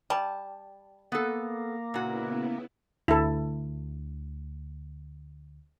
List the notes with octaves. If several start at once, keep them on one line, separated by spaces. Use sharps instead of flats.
G3 A5
A#3 B3 A4
A#2 C#3 B3 E4 F#4
D2 E4 A4